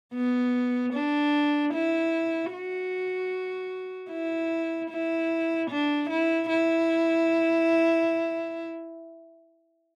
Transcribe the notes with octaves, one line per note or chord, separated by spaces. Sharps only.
B3
D4
E4
F#4
E4
E4
D4
E4
E4